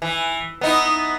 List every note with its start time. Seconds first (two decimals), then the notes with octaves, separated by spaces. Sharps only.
0.02 E3
0.61 B3 D#4 E4